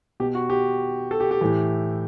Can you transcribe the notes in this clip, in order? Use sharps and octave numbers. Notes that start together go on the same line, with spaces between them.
B2 G4
F#4
G4
A4
G4
G4
A2 E3 G4